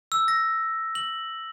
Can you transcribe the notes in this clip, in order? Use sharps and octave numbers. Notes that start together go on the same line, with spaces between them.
E6
A#6
F#7